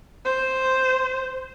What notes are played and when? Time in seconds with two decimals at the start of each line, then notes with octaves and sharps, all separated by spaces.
0.25 C5